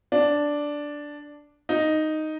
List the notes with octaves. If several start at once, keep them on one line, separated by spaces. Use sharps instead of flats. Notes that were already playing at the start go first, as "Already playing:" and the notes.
D4
D#4